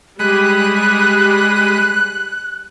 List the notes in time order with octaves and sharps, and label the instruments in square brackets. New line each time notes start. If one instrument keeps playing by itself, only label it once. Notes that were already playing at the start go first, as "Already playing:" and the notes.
[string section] G3 [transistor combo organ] G#3 B5 D#6 [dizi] F#6